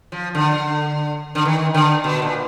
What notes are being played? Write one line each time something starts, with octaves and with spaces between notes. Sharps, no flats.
F3
D3
D3
D#3
D3
B2
A#2